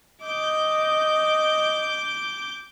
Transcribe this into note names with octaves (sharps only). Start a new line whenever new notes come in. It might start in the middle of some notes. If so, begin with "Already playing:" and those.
D#5 D6 G6